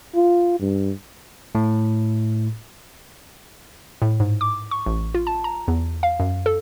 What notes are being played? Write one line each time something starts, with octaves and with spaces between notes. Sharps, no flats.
F4
G2
A2
A2
G#2
D6
C#6
A1
F4
A5
A#5
E2
F5
F#2
A4